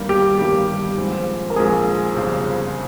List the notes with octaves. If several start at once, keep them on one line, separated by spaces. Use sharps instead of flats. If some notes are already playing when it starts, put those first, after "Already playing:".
Already playing: G1 G2 D#3 G3 A#3
G4
G1 G2 D#3 G3 A#3 G4
A#1 G#2 F3 C4
A#4
A#1 G#2 F3 C4 G#4
G1 F2 C#3 G3 C4